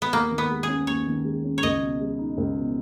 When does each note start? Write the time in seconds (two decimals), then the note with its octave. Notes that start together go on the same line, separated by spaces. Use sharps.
0.02 B3
0.13 D#2 A#3
0.32 D#3
0.38 B3
0.50 G#3
0.63 G#4
0.69 C#4
0.87 D#2 C#5
1.07 D#3
1.25 G#3
1.44 C#4
1.58 C#5
1.63 C#2 D#5
1.81 B2
2.00 G#3
2.19 D#4
2.38 C#2
2.57 B2